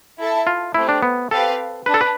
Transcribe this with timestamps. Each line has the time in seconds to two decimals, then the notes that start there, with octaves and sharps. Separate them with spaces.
0.18 E4 A4 E5 A5
0.47 F4
0.74 A3 C4 E4 G4
0.89 D4
1.03 B3
1.31 C4 G4 A4 B4 F5
1.86 D4 B4
1.94 A4
2.01 B4